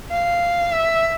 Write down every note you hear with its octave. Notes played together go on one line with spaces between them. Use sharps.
F5
E5